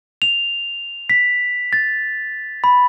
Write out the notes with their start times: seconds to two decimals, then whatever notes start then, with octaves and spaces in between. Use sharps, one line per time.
0.22 F7
1.10 B6
1.73 A6
2.64 B5